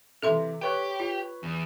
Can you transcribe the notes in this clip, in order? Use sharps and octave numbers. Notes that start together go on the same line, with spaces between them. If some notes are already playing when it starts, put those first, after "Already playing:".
C3 E3 A4 E5 C6
G4 B4 C#5 F#6
F4
E2